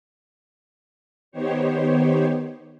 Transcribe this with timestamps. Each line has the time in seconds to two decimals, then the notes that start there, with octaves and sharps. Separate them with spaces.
1.32 D#3 B3 D#4 G4 C5 C#5